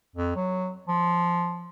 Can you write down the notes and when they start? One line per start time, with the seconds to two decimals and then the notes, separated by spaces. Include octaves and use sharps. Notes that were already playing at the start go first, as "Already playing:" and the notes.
0.15 F2
0.35 F#3
0.88 F3